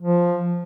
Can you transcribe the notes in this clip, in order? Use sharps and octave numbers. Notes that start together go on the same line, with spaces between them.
F3